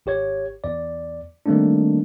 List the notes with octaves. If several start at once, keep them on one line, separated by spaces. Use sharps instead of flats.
G#1 G4 C#5 G#6
E2 D5
D#3 G3 A3 A#3 C4 D4